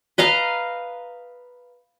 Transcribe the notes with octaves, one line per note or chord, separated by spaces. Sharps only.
B4 D#5 F5 A#5